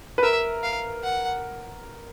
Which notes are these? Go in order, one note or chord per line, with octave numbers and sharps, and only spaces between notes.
B4
A#4 E5
F5
F#5